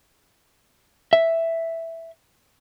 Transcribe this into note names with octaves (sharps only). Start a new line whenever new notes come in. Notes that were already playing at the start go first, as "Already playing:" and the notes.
E5